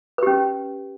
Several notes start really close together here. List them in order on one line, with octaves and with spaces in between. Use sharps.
B4 G4 C#4